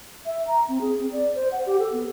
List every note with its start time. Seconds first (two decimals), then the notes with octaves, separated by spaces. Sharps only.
0.26 E5
0.47 A#5
0.68 C4
0.81 G#4
1.00 C4
1.12 D5
1.35 C5
1.52 F#5
1.66 G4
1.80 A4
1.92 B3